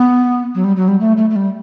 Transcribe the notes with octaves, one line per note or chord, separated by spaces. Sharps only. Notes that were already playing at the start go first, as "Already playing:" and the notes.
Already playing: B3
F#3
G3
F#3
G3
A3
A3
A3
G3